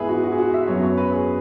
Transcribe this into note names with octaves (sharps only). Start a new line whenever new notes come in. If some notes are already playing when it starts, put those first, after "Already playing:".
Already playing: G#2 E3 B3 E4 G#4 B4 E5
F#4
F#4
G#4
F#4
E5
F#2 F#3 B3 C#5
C#5
B4
G#4